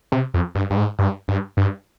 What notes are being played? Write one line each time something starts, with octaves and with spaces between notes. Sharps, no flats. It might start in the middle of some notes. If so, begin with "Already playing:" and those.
C3
F2
G2
G2
G#2
G2
G2
G2